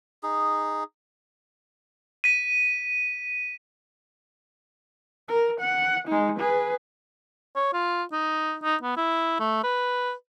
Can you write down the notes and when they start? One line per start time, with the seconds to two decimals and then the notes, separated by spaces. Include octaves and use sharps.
0.23 D#4 G#4
2.24 B6 D#7
5.28 A#4
5.61 F#5
6.08 G#3 D#4
6.39 G#4 B4
7.56 C#5
7.73 F4
8.12 D#4
8.63 D#4
8.83 B3
8.97 E4
9.40 A3
9.63 B4